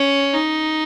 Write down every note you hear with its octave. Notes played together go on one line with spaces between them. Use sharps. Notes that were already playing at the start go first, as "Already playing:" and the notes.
Already playing: C#4
D#4